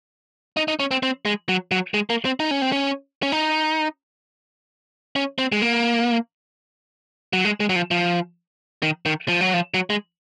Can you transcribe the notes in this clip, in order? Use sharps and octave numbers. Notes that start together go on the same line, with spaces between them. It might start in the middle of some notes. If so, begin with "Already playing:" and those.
D#4
D#4
C#4
C4
C4
G#3
F#3
F#3
G#3
A#3
C4
D#4
C#4
C4
C#4
C#4
D#4
C#4
C4
G#3
A#3
F#3
G#3
G#3
F#3
F3
F3
D#3
D#3
F3
F#3
F3
F#3
G#3